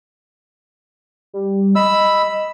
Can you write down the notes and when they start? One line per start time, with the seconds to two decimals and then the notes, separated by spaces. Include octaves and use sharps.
1.33 G3
1.76 D#5 B5 E6